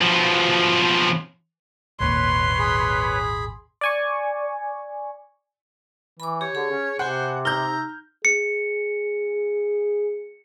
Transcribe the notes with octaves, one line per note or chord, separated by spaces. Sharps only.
B2 F3
G#1 D#2 A#2 B4 C#5 C6
G#4 B5
D5 G#5 C#6
E3 B5 D6
G4 C#5
D3 G#4
C#4
C3 C5 F#5 G#5 B5
D#4 A#5 E6 F6 G6
G#4 C#7